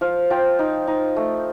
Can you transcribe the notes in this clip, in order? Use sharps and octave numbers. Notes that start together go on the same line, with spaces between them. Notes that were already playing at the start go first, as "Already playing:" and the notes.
F3 F5
F3 G5
D#4
D#4
A3